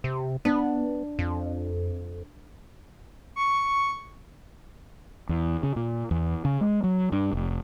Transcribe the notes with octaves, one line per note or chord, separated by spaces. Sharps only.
C3
B3 D4
F2
C#6
E2
C#3
A#2
E2
C#3
G#3
F#3
G2
F1